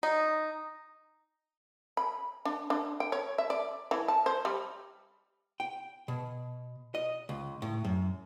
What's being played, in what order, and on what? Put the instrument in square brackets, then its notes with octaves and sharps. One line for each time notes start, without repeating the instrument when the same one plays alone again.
[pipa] D#4
[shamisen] B5
D4
D4
G5
C#5
E5
D5
E3
A5
C5
G3
[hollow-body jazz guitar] G5
B2
D#5
C#2
A2
F#2